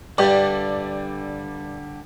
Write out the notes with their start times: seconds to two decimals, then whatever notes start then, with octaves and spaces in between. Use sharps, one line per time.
0.18 G2 D3 G3 D4 G4 D5